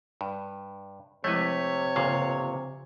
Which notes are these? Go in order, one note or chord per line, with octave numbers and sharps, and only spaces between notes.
G2
C3 F3 G#3 A3 E4 B4 C#5
G1 A#2 C#3 F5